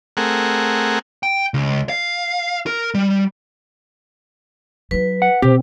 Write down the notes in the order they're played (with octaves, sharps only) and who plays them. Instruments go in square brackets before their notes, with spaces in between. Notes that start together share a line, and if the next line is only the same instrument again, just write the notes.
[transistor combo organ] A3 C4 G#4 A#4 F#5
[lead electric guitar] G5
C#2
F5
A#4
G3
[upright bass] F#3 D#4 [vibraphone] B4
[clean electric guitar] F#5
[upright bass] B2 [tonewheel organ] C4 [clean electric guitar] G4